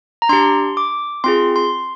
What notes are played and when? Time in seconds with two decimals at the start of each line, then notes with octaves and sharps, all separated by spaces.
0.22 A#5
0.29 D4 G4 C6
0.77 D6
1.24 C4 F4 G#4 C6
1.56 C6